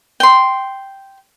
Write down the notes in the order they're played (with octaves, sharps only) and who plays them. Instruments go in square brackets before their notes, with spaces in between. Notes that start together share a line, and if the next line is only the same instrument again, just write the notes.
[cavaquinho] G5 C6